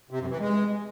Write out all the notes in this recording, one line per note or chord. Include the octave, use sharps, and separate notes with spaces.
C3
F#2
E3
G#3